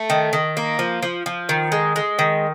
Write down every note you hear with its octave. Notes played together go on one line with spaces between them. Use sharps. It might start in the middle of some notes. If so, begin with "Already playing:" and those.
Already playing: A3
D#3
D#3
A#3
F3
F3
F3
D#3
G#3
G#3
D#3